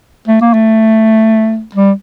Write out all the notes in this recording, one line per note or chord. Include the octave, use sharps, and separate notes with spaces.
A3
A#3
A3
G3